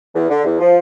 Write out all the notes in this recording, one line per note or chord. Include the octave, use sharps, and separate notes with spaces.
E2
D3
E2
F3